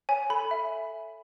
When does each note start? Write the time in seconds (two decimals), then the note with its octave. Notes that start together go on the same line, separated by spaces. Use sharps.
0.09 C#5 G#5
0.30 A4 B5
0.51 E5